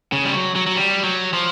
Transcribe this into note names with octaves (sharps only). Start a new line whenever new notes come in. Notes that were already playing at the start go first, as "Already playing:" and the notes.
C#3
G3
F#3
F#3
F#3
G3
F#3
F3